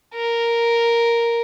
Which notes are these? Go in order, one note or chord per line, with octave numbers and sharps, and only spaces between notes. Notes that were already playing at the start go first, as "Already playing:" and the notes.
A#4